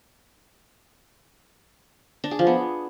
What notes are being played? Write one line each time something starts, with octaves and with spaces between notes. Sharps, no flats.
D4
G#4
F3
B3